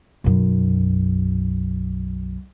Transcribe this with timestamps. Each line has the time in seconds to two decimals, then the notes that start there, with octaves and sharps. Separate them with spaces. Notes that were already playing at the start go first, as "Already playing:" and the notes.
0.24 B1 F#2